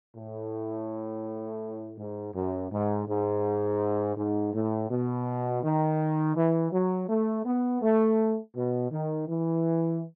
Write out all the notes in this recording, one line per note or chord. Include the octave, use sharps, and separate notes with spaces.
A2
G#2
F#2
G#2
G#2
G#2
A2
B2
D#3
E3
F#3
A3
B3
A3
B2
D#3
E3